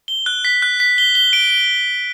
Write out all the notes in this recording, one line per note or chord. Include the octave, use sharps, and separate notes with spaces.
G7
F#6
B6
F#6
B6
G7
G7
D7
G7